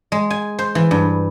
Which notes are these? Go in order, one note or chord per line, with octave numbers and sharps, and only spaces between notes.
G#3
G#5
C5
E3
G2